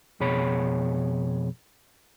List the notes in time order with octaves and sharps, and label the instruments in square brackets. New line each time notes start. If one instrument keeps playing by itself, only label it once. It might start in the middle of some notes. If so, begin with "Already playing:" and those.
[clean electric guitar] F2 B2 G#4 C#5 B5